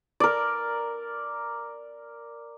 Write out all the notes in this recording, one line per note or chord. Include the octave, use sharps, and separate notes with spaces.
A#4 D5